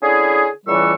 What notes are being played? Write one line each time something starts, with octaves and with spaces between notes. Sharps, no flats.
D3 C#4 E4 G#4
C#2 A2 E3 G3 C#6 E6